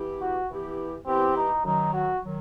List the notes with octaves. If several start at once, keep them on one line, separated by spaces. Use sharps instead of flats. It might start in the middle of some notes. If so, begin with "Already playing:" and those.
Already playing: E3 B3 E4 G4
F#4
E3 B3 E4 G4
E3 B3 C4 E4 G4
D#4
F#2 D#3 F#3 D#4
F#4
D#3 F#3